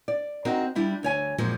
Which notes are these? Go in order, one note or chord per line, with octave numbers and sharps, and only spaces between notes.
D5
C4 D#4 F#4 A#4
G3 D4 E4 F4
D2 C#5 G#5
F#2 A#2 F3 G#3 A#3